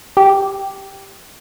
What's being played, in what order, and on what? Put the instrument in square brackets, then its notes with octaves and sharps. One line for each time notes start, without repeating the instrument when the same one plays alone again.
[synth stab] G4